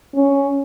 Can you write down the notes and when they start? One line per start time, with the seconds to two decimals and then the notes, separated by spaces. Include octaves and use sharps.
0.15 C#4